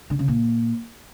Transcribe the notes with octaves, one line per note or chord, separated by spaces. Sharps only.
D3
C#3
A#2